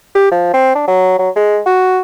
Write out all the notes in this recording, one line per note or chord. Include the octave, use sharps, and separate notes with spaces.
G4
F3
C4
D4
F#3
F#3
G#3
F#4